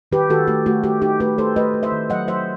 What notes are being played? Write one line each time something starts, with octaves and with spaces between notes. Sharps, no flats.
D#3 G4 B4
D#3 F#4 A4
A3 G4
A3 F#4
A3 G4
D#4 G4
A3 G4 B4
A3 A4 C5
A3 B4 D#5
A3
C5 E5
D#3
F#3 D#5 F#5
F#3 C5 E5